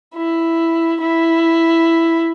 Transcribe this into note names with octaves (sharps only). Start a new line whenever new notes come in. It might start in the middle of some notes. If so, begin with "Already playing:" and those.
E4
E4